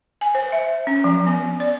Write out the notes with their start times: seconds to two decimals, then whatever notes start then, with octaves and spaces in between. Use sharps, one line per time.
0.21 G#5
0.35 C5
0.52 E5
0.87 C#4
1.04 F3
1.27 B3
1.60 D5